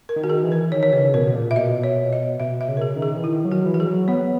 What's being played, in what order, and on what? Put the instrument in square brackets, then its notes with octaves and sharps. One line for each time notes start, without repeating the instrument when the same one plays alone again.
[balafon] A#4
[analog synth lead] D#3
[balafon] F#4
G#4
[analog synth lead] E3
[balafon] A#4
[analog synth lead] D#3 [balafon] C#5
[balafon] C#5
[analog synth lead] C#3 [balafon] B4
[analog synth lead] B2 [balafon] A#4
[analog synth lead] B2
A#2
[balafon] E5
[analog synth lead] B2 [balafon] D#5
[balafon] C#5
D#5
[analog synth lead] B2 [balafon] E5
[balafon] E5
[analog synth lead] C#3
[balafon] A#4
G#4
[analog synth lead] D#3
[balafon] G#4
[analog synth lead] E3
[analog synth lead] D#3 [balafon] E4
[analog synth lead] F#3
[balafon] F#4
[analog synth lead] E3
[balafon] F#4
G#4
[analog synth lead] F#3
[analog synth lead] B3 [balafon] C#5